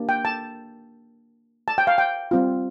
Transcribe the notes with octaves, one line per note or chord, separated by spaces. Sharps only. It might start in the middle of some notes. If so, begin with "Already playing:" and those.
Already playing: A#3 D4 G4
G5
A5
A5
G5
F5
G5
G3 C4 F4